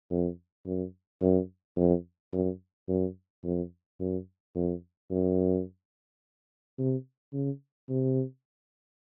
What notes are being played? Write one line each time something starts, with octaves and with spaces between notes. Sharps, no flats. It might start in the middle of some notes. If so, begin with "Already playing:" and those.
F2
F#2
F#2
F2
F#2
F#2
F2
F#2
F2
F#2
C3
C#3
C3